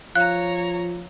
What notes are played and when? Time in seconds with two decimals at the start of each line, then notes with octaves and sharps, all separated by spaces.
0.15 F3 C#5 F5 A#5 F#6